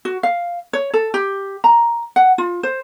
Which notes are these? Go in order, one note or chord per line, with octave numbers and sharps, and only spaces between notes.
F#4
F5
C#5
A4
G4
A#5
F#5
F4
C5